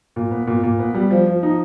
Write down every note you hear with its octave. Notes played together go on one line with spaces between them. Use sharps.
A#2
B3
A#2
A#2
B3
G3
F3
F3
D#4